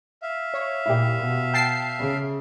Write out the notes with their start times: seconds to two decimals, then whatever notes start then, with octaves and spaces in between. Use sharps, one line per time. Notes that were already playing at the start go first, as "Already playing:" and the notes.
0.22 E5 F5
0.54 C#5
0.86 A#2 E4 G4
1.20 B2
1.53 G5 A5 C7
2.00 C#3